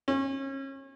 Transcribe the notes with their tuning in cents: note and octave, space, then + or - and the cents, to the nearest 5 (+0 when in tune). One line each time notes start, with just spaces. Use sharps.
C#4 -30